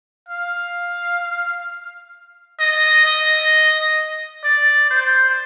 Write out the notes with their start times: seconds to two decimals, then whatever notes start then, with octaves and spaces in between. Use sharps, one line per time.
0.29 F5
2.60 D#5
3.05 D#5
4.44 D5
4.91 C5